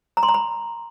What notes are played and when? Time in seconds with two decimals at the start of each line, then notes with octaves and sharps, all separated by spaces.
0.17 A#5
0.23 C6
0.29 A#5
0.34 B5